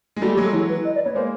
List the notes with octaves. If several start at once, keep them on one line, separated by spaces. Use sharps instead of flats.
G#3
G3 A3 F#4
G4
F#3 G#3
A4
E3 F#3
B4
D#5
D5
B3 C#5
G#3 A#3 C5